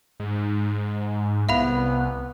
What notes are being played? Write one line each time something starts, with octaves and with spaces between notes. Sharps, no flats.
G#2
C2 B3 E5 F5 B5